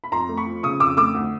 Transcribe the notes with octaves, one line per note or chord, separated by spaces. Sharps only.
B5
F2 A#5 C6
A3
B5 C#6
F3
C#3 C#6 D#6
F2 D6 E6
A3 D6 E6
D2